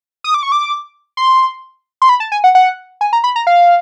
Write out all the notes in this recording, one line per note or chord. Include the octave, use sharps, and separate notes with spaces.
D#6
D6
C#6
D6
C6
C6
B5
A5
G#5
F#5
F#5
G#5
A#5
B5
A#5
F5